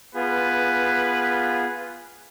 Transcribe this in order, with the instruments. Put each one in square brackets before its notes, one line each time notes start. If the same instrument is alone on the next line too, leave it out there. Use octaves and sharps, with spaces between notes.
[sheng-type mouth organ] B3 F4 G#4 [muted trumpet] B4